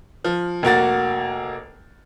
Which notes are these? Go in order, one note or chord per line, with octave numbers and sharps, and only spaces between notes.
F3
F1 A#3 F#4 A6